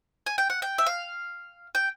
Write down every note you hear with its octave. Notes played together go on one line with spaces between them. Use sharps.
G#5
G5
F#5
G5
E5
F5
G5